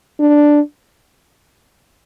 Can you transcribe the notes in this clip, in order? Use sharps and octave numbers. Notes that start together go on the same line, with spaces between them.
D4